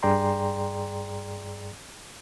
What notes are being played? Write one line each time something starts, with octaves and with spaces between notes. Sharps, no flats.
G2 G#4 D5 G5 A#5 C6